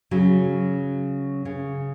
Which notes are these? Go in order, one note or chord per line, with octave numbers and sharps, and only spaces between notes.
C#3 F#3
C#3